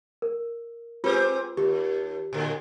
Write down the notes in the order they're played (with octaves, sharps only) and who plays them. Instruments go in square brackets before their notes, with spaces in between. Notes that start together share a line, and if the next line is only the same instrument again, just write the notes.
[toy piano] A#4
[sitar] C4 G4 G#4 [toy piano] F4 B4 E6
[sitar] D#2 [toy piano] G4
[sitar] A2 D3